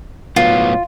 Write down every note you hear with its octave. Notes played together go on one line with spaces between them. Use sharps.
A2 F#3 B3 F4